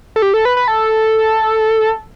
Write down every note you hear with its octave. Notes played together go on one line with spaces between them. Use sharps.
A4
G4
A4
B4
B4
A4